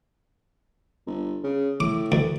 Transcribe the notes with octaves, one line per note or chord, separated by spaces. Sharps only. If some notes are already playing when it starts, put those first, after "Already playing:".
G1
C#3
A2 D6
D2